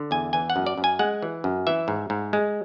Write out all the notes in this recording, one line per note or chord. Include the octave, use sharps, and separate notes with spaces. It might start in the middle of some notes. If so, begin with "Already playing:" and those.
Already playing: D3
E2 G#5
E3 G#5
F#5
F#2
D5
F#2
G#5
G#3 F#5
E3
F#2
E3 E5
G#2
G#2
G#3